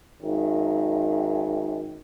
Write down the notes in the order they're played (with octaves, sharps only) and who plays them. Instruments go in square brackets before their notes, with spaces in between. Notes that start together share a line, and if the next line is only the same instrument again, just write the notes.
[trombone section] G#1 F#2 D#3